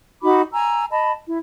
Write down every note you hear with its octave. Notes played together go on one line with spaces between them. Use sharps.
D#4 F#4 B5 D6
G#5 A#5 E6
D#5 A5 B5
E4